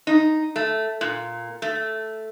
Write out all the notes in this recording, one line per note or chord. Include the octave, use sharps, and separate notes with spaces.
D#4
A3
A#2
A3